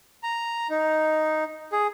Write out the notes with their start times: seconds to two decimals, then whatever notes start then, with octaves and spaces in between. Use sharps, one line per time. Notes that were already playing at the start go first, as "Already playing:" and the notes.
0.23 A#5
0.70 D#4
1.72 G#4